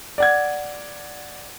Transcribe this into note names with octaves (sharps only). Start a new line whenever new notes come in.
D5 F#5 G#6